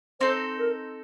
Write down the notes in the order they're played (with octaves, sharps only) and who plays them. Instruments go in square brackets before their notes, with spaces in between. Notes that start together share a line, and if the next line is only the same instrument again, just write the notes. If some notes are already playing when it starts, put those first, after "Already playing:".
[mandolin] C4 D#4 A4 [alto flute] C5
[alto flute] A#4